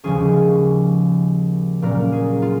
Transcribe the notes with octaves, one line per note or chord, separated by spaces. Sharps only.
D#2 C#3 F3 G#3 C#4 G#4
A#2 F#3 A#3 C#4 A#4
G#4
F4